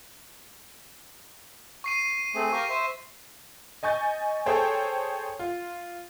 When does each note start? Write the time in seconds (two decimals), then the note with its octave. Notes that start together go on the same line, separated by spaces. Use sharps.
1.84 C#6 C7 D#7
2.35 A3 C4 G#4
2.53 G4 A#4 F5 C#6
2.69 C5 E5 C#6
3.83 D#5 G#5 C#6 G6 A6
4.46 G#4 A4 C5 C#5 G5
5.39 F4